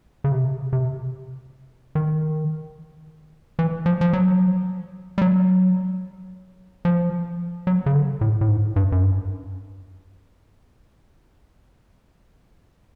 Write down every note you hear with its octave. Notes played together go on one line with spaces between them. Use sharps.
C#3
C3
C3
D#3
E3
F3
F3
F#3
G3
F#3
F3
F#3
C#3
D3
A2
A2
G#2
G2
F#2
G2